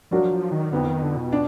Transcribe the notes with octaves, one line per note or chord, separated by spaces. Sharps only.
F3 F#3 D4 F#4 A#4 D5
F3
D#3
F2 D3 F3 B3 D#4
D#3
D3
B2
D4